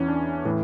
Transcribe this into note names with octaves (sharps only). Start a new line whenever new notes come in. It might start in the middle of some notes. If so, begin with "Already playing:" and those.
Already playing: E2 E3 C#4
D4
A2 E3